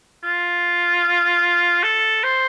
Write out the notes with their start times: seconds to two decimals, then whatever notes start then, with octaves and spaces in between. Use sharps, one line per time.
0.24 F4
1.83 A4
2.24 C5